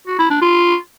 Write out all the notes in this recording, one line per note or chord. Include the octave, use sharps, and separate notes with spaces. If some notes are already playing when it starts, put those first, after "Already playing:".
F#4
E4
D4
F4